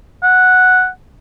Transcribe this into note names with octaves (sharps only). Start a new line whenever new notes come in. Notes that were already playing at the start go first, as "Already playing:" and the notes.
F#5